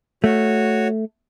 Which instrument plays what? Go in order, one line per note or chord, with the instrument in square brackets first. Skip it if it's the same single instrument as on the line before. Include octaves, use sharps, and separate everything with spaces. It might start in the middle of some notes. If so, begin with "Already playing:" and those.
[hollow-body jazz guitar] A3 [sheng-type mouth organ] F#4 C#5